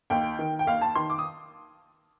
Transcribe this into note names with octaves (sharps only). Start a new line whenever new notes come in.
D#2 G5
D#3
G5
D#2 F5
A5
D#3 C6
D6
D#6